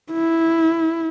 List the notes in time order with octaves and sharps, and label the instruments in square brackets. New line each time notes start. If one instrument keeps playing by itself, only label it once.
[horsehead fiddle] E4